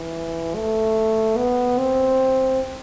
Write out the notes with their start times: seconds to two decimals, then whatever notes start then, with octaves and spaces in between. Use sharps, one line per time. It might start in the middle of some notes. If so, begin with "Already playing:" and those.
Already playing: E3
0.55 A3
1.37 B3
1.78 C4